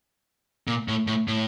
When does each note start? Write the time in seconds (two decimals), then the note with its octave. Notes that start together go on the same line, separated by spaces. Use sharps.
0.67 A#2
0.88 A2
1.07 A2
1.28 A2